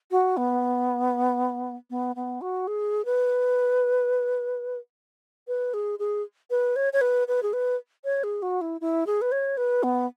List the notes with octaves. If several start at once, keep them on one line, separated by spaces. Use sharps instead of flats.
F#4
B3
B3
B3
F#4
G#4
B4
B4
G#4
G#4
B4
C#5
C#5
B4
B4
G#4
B4
C#5
G#4
F#4
E4
E4
G#4
B4
C#5
B4
B3